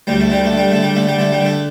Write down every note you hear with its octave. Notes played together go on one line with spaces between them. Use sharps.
D2 G3
A3
D3 G3
A3
D3
G3
D3 A3
G3
D3 A3
G3
D3 A3
G3
D3 A3